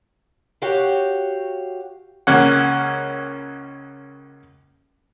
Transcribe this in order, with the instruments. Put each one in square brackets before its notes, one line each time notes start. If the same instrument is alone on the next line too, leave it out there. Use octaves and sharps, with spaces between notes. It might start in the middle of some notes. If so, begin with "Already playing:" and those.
[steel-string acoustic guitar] F#4 G4 C#5 F5 F#5
[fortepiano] C#2 A#3 C#4 F#5